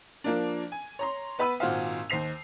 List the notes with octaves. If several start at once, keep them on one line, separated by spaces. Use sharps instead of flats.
F3 A#3 D4
G#5
C#5 A#5 C6
B3 B4 B5 E6 D#7
G#1 A#2 F#4 C5 F5
D#2 C5 C7 F7